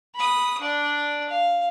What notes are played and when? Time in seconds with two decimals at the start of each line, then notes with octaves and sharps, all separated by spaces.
0.15 B5 D#6
0.61 D4 D5
1.29 F5